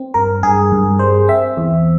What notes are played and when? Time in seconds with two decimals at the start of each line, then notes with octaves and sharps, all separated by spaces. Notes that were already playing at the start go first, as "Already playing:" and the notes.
Already playing: C4
0.14 G2 A#4
0.43 G2 G#4
0.72 G2
0.99 G3 C5
1.28 C4 E5
1.57 E2